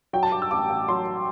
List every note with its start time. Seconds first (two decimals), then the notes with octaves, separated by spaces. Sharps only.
0.13 F#3 G5
0.23 A5
0.32 G2 D6
0.42 E6
0.51 A1 D6
0.70 A1
0.88 F#3 C6